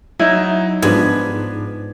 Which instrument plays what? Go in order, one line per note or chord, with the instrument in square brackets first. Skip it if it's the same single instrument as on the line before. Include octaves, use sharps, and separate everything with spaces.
[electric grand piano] F#3 D#4 [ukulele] E4
[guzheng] G#2 [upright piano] F3 B3 D4 [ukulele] B4 [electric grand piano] G#6